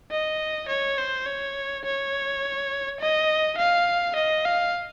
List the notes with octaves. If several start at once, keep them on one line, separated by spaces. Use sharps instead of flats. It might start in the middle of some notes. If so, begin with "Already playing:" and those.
D#5
C#5
C5
C#5
C#5
D#5
F5
D#5
F5